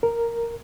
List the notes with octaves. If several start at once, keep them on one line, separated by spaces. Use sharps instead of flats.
A#4